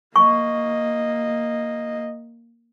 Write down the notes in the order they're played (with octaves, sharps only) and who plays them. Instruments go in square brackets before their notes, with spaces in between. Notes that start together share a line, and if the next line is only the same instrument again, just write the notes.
[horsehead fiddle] A#3 D#5 [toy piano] C#6